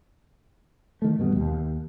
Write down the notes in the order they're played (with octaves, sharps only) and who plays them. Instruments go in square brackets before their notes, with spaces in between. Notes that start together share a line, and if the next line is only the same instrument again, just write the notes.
[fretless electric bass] D#3 A3
E1 G2 B2
D#2